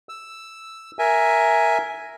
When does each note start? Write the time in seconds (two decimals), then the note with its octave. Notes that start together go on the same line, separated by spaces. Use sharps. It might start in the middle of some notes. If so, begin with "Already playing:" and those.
0.09 E6
0.99 A#4 E5 G#5